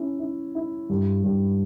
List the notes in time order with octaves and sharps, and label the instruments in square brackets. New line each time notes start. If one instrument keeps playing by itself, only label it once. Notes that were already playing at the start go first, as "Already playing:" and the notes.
Already playing: [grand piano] C#4 E4
E4
E4
G2
G2